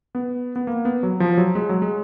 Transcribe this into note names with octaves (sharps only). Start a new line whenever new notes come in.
B3
B3
A#3
B3
F#3
F3
F#3
G#3
F#3
G#3